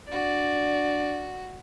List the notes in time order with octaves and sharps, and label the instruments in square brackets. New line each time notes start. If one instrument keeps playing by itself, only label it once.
[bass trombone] D4 [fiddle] F#4 [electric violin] D5